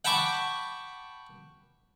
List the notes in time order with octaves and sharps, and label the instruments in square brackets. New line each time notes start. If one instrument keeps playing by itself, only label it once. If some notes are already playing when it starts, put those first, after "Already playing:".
[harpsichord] F#5 G5 A5 B5 C#6 D6